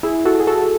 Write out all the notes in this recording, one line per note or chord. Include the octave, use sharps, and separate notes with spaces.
E4 G#4
F#4 A4
G#4
F#4 A4